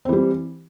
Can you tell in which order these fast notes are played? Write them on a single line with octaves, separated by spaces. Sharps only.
C4 E3 G3